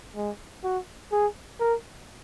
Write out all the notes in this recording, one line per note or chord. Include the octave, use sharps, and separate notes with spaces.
G#3
F#4
G#4
A#4